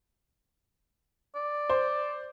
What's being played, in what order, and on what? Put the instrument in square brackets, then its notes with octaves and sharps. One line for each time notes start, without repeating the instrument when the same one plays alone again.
[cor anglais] D5
[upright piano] C5